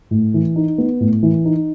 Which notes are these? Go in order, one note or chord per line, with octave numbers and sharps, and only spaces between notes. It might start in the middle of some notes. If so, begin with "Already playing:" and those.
A2
E3
D#4
B3
A2
E3
D#4